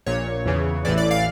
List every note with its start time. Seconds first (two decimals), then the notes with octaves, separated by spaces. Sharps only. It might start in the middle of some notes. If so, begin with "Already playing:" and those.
0.06 A#1 A#2 C#5
0.46 E2 C#3 E3
0.85 A1 A2 E3 D5
0.98 D5
1.11 F5